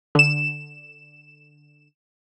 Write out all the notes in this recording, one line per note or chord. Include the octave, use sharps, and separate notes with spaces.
D3 E7